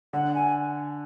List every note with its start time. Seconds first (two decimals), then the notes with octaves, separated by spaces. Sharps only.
0.13 D3 F#5
0.35 G#5